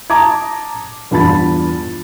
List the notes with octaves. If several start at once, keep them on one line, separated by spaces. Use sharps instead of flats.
A5 A#5 D6 D#6 G#6
E2 G2 F4 A5 B5 A6